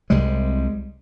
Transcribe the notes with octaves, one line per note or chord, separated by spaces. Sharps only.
C2 C3 G3 G#3